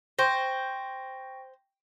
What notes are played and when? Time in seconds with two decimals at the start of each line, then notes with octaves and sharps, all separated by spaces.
0.19 C5 G5 C#6 A#6